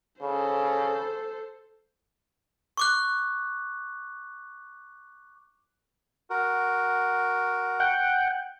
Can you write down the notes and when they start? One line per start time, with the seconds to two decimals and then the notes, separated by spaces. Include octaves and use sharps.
0.21 C#3 A4 C5
2.77 C#6 D6 F#6
6.30 F#4 A#4
7.80 F#5 G5